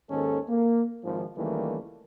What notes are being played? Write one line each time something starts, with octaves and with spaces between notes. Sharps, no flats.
D#2 G#2 D#3 C#4 A4
A#3
G#1 F3
C#2 D#3 E3 G3 A3 A#3